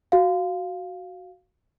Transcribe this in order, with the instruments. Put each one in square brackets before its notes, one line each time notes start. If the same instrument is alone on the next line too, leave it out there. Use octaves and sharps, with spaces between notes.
[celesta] F#4 F5